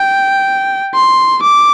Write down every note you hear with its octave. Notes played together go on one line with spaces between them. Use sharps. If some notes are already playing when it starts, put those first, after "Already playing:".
Already playing: G5
C6
D6